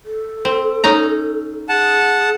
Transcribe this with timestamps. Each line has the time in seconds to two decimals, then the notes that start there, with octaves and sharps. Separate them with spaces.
0.05 A4
0.45 C4
0.84 C#4 D#4 A#5
1.69 G#4 F#5 A5